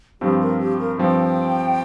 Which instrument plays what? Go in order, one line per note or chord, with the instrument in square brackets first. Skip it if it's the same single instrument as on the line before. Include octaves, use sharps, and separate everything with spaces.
[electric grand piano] G2 F3 C4 [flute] G4
[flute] A#4
G4
A#4
[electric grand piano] G2 F3 C4 [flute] G5